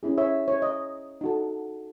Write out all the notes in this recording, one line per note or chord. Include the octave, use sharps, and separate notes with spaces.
C#4 E4 G#4
C#5 E5
C#5
D#5
D#4 F#4 A4